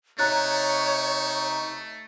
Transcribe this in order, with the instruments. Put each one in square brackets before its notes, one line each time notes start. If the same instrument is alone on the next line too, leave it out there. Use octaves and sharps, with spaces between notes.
[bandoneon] C3 D#4 C#6 [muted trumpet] A3 [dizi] C#5 [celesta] A#5 F#6 A6